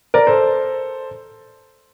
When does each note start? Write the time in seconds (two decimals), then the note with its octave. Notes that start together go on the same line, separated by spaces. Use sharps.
0.14 A#4 D5
0.27 A4 C5